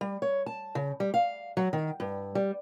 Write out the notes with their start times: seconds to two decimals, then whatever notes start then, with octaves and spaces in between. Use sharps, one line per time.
0.01 G3
0.22 C#5
0.46 A5
0.75 C#3
1.00 G3
1.14 F5
1.57 F#3
1.73 D#3
2.00 G2
2.35 G3